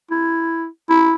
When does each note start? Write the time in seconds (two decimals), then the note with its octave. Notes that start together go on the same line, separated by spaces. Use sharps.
0.11 E4
0.90 E4